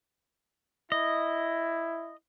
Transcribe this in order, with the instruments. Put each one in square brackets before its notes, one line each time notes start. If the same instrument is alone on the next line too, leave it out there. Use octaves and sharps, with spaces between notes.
[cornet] E4 [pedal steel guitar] D#5